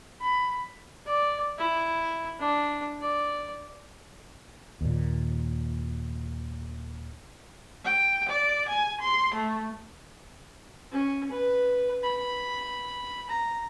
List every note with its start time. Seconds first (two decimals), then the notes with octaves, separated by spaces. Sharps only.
0.20 B5
1.06 D5
1.58 E4
2.39 D4
3.01 D5
4.81 D#2 A#2
7.85 G5
8.29 D5
8.69 G#5
9.01 C6
9.35 A3
10.92 C#4
11.31 B4
12.03 B5
13.30 A#5